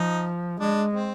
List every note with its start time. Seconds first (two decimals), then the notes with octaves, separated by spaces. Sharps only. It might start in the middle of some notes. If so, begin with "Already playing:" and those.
Already playing: F3 D#4
0.59 G#3 D4
0.93 C4